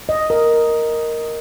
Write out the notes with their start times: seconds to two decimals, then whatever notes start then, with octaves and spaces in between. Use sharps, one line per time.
0.09 D#5
0.30 A#4